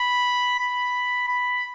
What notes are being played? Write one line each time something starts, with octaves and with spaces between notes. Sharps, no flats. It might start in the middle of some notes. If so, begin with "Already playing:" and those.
Already playing: B5
B5
B5